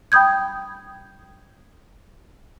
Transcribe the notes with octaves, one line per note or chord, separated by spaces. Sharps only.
G5 B5 D#6 G6 G#6